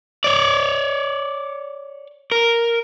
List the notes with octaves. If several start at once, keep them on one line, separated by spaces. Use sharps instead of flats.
C#5 D5
A#4